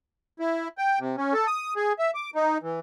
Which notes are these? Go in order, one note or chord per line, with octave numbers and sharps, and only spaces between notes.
E4
G5
C3
C#4
A4
D#6
G#4
E5
D6
D#4
E3